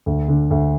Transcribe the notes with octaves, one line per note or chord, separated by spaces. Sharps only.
D2
D3
D2